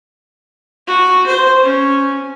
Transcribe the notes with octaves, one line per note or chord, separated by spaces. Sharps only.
F#4
C5
C#4